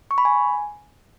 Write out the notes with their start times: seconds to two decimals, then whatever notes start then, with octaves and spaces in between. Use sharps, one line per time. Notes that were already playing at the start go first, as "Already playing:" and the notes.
0.11 C#6
0.18 B5
0.25 G#5